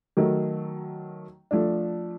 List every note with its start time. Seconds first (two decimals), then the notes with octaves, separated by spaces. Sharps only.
0.17 D#3 F#3 A3
1.51 F3 A3 D4